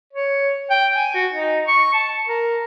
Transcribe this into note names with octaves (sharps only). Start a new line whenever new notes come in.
C#5
G5
G#5
F#4
D#4
C#6
A5
A#4